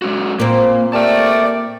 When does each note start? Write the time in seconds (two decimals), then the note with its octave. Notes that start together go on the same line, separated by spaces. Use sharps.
0.02 G#3 C#4 F#4
0.40 A#2 A#3 C4
0.93 G4 A#4 D5 E5 A5